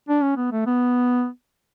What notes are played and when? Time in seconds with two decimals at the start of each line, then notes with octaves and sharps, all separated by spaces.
0.09 D4
0.22 C#4
0.37 B3
0.52 A3
0.66 B3